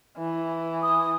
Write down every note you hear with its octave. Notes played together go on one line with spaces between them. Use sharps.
E3
D#6